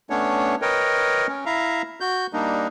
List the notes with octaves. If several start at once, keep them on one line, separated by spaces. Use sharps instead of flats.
A3 B3 C#4 D4 C#5
A#4 B4 C#5 D#5 G5
C#4
E4 E5 F5 A#5
F#4 G6
G3 A#3 D4 D#4